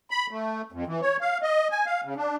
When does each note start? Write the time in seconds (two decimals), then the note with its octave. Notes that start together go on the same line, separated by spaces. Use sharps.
0.11 B5
0.31 A3
0.72 F2
0.87 E3
1.02 C#5
1.21 F5
1.42 D#5
1.71 G#5
1.86 F5
2.05 C#3
2.17 D4